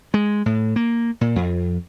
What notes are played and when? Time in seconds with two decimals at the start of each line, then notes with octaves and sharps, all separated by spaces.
0.14 G#3
0.46 A2
0.76 A#3
1.21 A#2
1.36 F2